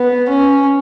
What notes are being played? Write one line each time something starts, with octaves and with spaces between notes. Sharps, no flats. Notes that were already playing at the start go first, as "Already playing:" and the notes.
Already playing: B3
C#4